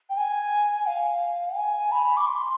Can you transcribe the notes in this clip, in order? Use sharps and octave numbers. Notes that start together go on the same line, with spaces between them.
G5
G#5
F5
G#5
B5
D6
C6